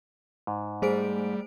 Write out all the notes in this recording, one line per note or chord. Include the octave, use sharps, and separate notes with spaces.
G#2
G3 A3 G#4 C5 D7